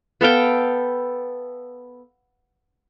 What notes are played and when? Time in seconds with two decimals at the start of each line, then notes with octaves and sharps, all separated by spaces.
0.21 B3 A4 F5 G5